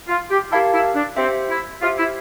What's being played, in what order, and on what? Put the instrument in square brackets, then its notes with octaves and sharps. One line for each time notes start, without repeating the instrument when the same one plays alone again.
[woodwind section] F4
G4
[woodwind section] E4 [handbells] G4 A#4 F5 A5
[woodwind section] E4
D4
[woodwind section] C4 [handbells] G4 C5 E5
[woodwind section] E4
[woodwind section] F4 [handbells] G4 C5 E5
[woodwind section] E4